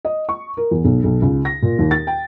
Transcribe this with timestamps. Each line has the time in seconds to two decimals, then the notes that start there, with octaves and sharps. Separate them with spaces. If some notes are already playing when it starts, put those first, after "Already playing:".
0.05 D#5
0.29 C#6
0.57 A#4
0.71 E2
0.85 B1
1.04 B1
1.22 C#2
1.45 A#6
1.62 A#2
1.79 D#2
1.91 A6
2.07 G5